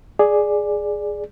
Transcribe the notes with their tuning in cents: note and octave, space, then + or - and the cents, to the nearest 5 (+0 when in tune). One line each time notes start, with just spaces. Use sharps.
G#4 +0 D5 +5